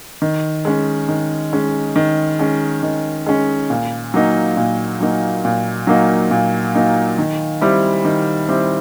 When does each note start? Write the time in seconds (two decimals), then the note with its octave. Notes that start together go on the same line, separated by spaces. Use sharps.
0.22 D#3
0.65 G#3 C#4
1.08 D#3
1.53 G#3 C#4
1.96 D#3
2.39 G#3 C#4
2.83 D#3
3.26 G#3 C#4
3.70 A#2
4.14 F#3 A#3 D#4
4.57 A#2
5.00 F#3 A#3 D#4
5.45 A#2
5.87 F#3 A#3 D#4
6.31 A#2
6.75 F#3 A#3 D#4
7.18 D#3
7.61 G3 C4 E4
8.05 D#3
8.48 G3 C4 E4